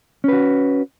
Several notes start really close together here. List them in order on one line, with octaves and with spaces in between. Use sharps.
C#4 B4 F#4